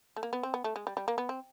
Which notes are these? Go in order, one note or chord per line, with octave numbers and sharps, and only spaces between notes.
A3
A#3
B3
C4
B3
A3
G#3
G3
G3
A#3
B3
C4